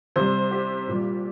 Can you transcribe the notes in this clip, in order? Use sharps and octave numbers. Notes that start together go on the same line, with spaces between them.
C3 G3 C5
G4
A#2 G3